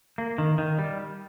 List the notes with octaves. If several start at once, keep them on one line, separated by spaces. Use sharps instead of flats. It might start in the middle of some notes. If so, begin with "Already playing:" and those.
A#3
D#3
D#3
G3